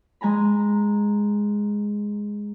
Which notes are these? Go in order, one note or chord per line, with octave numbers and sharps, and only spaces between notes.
G#3 G#5 A#5 B5